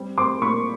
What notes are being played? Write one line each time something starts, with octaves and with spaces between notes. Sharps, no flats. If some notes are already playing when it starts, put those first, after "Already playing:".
Already playing: G3 C4
C4 C6 D6
A#2 B5 C#6